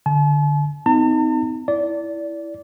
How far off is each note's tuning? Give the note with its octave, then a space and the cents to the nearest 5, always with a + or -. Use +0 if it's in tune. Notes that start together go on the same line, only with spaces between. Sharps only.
D3 +0 A5 -45
C4 -40 D#4 +15 A5 +45
E4 +0 D5 -20